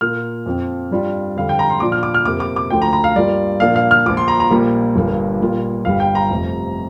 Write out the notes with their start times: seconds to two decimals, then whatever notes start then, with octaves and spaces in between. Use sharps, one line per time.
0.01 A#2 A#3 F4 F6
0.46 F2 F3 C4
0.91 G2 G3 D4 F4
1.36 F2 D3 G3 F5
1.49 G5
1.59 A#5
1.70 C6
1.80 A#2 F3 D4 F4 D6
1.92 F6
2.03 D6
2.14 F6
2.25 F2 C3 A#3 D6
2.40 D6
2.56 D6
2.70 D2 D3 F3 G5
2.82 A#5
2.93 A#5
3.04 F5
3.15 G2 G3 A#3 F4 D5
3.60 A#2 F3 A#3 D4 F5
3.76 F5
3.91 F6
4.06 A#1 A#2 F3 D6
4.17 C6
4.28 A#5
4.40 A#5
4.50 A#1 A#2 G3 A#3 F4
4.96 G1 G2 G3 A#3
5.41 A#2 G3 A#3 F4
5.85 G1 G2 G3 F5
6.00 G5
6.15 A#5
6.30 F1 F2 C3